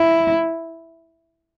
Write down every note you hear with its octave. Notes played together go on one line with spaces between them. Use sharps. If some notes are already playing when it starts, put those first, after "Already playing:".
Already playing: E4